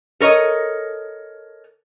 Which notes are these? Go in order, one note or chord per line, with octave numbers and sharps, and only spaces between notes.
A4 A#4 C#5 D#5